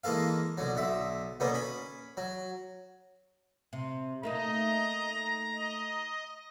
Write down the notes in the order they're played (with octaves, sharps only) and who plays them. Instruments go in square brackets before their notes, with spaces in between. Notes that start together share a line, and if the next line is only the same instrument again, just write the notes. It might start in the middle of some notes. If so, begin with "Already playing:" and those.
[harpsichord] E3 G#3 A#3 A4 F5
B2 D3 F#3
B1 D3 E5
B2 D3 A#3 B3 C#4
C#4 B5
F#3
[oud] C3
[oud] A3 A#3 D#4 [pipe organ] D#5 [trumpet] A#5
[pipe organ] D#5